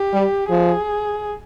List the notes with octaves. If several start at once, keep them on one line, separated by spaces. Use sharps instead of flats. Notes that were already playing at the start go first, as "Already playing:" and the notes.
Already playing: G4
G3
F3 G#4